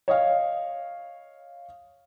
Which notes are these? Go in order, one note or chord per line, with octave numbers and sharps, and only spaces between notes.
C#5 D#5 F5